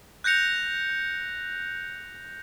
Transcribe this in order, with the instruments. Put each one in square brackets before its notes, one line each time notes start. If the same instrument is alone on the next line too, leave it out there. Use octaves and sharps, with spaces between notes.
[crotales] F#6 G6 A#6 C#7 F7